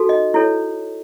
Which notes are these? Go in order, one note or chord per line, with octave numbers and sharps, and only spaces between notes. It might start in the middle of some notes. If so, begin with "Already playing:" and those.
Already playing: D#4 F#4 A4
D#5
E4 A4 C#5